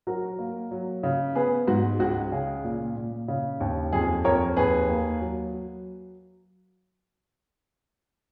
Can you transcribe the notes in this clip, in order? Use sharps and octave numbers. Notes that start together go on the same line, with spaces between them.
F#3 F#4 A#4
A#3
F#3
C#3
B3 G#4 B4
G#2 F#4
C#2 F#4
C#3 G#4
A#2
A#2
C#3
D#2
F2 G#4
F2 A#4 C#5
D#2 G#4 B4
A#3
F#3
F#3